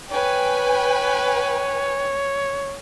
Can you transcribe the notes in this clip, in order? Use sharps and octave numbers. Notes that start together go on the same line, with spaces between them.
B4 C#5 G5 G#5